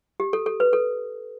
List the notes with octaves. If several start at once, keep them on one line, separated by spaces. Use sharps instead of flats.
G4
A4
A4
B4
A4